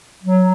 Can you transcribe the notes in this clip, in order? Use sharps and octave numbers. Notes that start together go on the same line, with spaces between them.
F#3